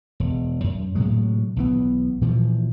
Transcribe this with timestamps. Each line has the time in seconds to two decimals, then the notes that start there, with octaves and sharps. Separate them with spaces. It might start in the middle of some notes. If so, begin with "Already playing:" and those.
0.20 E1
0.64 F#2
0.95 A2 C3 F#3 G#3
1.56 B1 E3 B3
2.21 A#2 E3 F3